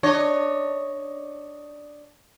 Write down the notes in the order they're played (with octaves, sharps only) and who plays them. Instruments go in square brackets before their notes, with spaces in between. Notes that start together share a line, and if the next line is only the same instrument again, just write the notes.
[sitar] D4 C#5 D#5